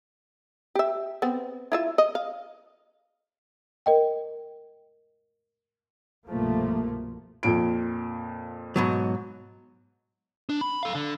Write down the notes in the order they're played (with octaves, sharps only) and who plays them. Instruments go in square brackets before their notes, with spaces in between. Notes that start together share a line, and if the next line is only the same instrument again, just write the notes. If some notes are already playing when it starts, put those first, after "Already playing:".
[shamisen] G4 E5
B3 C4
E4 F4 E5
D#5
F5
[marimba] A#4 D#5 G5
[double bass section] C2 G2 B2 F3 A3 A#3
[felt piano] F2 A#2 D7
[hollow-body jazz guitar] G#2 B2 F#3
[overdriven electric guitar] D4
B5
A4 F5
D3